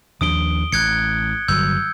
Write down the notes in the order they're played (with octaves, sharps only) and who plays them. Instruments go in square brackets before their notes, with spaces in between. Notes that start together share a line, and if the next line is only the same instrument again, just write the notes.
[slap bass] D#2 F3 D4 [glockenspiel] D#6 D7 G7
[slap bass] A1 [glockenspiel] F#6 G#6 C#7
[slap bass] G1 F#3 [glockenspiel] E6 G6